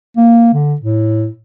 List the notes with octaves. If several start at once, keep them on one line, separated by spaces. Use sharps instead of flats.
A#3
D3
A2